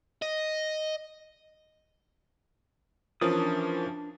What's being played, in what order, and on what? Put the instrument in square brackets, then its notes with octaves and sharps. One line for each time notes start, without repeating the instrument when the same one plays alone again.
[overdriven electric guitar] D#5
[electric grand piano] E3 F3 C#4 [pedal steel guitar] D4 D#6 [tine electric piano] F4 A#4 C5